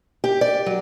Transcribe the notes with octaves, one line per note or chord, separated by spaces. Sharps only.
G4
D5
F#3